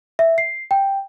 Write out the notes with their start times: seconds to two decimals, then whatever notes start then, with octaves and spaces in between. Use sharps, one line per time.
0.19 E5
0.38 C7
0.71 G5